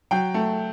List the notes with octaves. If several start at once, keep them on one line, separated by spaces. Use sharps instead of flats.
F#3 G5
A3